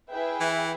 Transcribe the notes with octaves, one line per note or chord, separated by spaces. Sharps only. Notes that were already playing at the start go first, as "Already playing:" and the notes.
E4 G#4 B4 E5 G5
E3